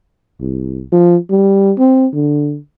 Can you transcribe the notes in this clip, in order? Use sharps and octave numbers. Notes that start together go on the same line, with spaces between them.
C2
F3
G3
C4
D3